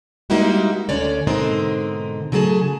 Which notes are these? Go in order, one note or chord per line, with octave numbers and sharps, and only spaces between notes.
G3 G#3 A#3 D#4 E4 F#4
D2 D3 C#4 C#5 D5
G#2 B2 D3 C4 D#4 A#4
C#3 F#3 A3 G#4 A5